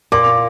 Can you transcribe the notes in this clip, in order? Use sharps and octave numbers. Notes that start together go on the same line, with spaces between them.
A#2 D6